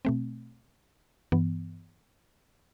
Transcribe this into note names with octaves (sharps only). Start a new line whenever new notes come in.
B2 A3 C4
G2 E3 B3